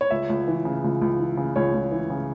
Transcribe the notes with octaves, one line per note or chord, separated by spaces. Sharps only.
C#5
C#2 E5
C#2
E3
C#3
C#2
C#2
E3
C#3
C#2 C#5
C#2
E3
C#3